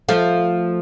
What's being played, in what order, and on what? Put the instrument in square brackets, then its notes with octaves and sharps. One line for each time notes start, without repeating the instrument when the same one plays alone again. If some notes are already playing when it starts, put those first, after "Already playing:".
[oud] F3 A3